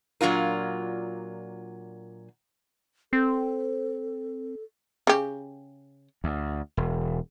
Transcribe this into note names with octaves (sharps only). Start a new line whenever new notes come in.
A#2 F#3 D4 F4 A#4
C4 A4
C#3 G4
D2
E1